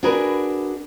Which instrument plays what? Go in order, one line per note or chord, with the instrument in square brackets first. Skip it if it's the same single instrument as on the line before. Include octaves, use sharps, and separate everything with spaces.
[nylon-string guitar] D4 F#4 G#4 A#4 B4